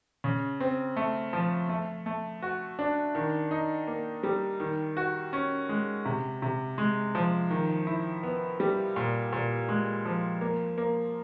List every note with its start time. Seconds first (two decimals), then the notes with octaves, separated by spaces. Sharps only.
0.24 C#3
0.60 C4
0.97 A3
1.33 F3
1.69 A3
2.06 A3
2.42 F#4
2.79 D4
3.15 D#3
3.51 D#4
3.87 A#3
4.23 G3
4.60 D#3
4.97 F#4
5.33 C#4
5.69 G#3
6.05 C3
6.42 C3
6.78 G#3
7.15 F3
7.50 D#3
7.87 E4
8.23 B3
8.60 G3
8.96 A#2
9.33 A#2
9.69 G#3
10.05 F3
10.41 A#3
10.78 A#3